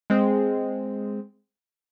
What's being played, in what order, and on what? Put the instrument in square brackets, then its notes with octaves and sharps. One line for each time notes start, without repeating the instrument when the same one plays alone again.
[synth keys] G#3 C4